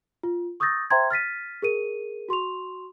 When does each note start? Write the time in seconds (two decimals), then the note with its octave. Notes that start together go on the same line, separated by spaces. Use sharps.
0.23 F4
0.60 C#6 D#6 E6 G6 A6 A#6
0.90 C5 E5 G5 A#5 C6 G#6
1.11 F6 A6 B6 D#7
1.62 G#4 A#4 D#7
2.29 F#4 C6 C#6 F7